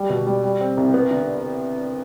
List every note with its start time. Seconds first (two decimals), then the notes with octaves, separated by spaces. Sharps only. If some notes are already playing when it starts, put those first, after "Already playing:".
Already playing: G3
0.10 B2
0.27 G3
0.43 G3
0.61 C4
0.77 C2
0.94 B3
1.11 D3